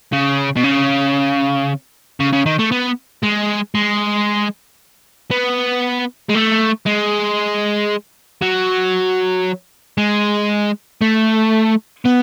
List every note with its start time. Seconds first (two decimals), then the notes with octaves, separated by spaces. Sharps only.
0.12 C#3
0.56 B2
0.64 C#3
2.20 C#3
2.32 C#3
2.46 D#3
2.59 A3
2.72 B3
3.24 G#3
3.75 G#3
5.31 B3
6.30 G#3
6.35 A3
6.86 G#3
8.42 F#3
9.98 G#3
11.01 A3
12.05 B3